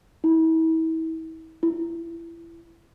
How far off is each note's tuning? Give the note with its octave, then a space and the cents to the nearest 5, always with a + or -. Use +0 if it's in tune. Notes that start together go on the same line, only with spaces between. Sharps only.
E4 -35
E4 +25